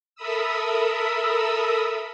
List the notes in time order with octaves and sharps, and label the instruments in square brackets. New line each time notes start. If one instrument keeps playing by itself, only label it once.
[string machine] A4 A#4 E5 B5 D#6 E6